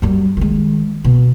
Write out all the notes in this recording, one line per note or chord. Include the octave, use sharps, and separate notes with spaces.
F#2 G3
D#3 G#3
B2